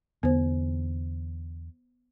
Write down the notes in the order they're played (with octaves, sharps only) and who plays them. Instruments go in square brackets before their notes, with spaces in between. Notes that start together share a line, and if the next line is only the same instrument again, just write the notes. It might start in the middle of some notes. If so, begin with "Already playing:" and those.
[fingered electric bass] E2 D3 [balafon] B3 C5